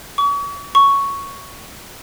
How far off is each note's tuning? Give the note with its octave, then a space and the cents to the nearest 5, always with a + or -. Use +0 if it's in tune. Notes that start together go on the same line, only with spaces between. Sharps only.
C#6 +40
C#6 +5